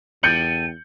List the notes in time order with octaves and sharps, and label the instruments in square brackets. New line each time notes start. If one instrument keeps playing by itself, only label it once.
[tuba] E2 [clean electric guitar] A4 G5 [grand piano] G6 C#7 F#7 [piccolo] D#7